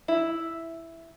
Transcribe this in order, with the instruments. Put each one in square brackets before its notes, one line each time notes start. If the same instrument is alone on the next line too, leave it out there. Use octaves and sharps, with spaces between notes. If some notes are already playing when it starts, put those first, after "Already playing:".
[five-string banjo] E4